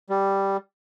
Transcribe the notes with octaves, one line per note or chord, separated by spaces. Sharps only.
G3